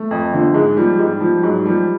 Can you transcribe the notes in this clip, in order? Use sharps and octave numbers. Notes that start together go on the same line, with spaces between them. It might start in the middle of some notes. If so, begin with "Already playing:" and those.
Already playing: A3
F2
D3 F3
G#2 G#3
F3 G3
G#2 G3
F3
G#2 F#3
F3 G3